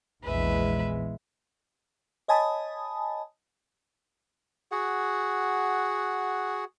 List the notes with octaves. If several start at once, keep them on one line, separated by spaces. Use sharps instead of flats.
A#1 E2 G#3 B4 E5
C#5 D#5 G#5 A5 B5 D#6
F#4 G#4 F#5